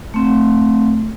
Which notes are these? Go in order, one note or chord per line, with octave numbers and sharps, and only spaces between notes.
A3 C4